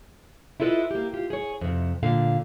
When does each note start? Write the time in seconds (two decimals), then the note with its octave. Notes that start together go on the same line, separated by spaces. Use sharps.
0.60 E4 F4 A4 B4 D5 D#5
0.91 A#3 G4
1.13 F4 G4
1.30 G#4 C#5
1.61 F2 C3
2.03 A#2 D3 F5